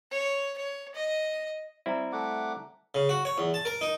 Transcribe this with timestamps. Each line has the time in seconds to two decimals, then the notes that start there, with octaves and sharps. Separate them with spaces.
0.11 C#5
0.58 C#5
0.94 D#5
1.86 G3 C4 E4 E5 A#5
2.13 A3 F#5 D6
2.95 C#3
3.09 F#4
3.25 C#5
3.38 E2
3.54 A5
3.65 A#4
3.81 D#4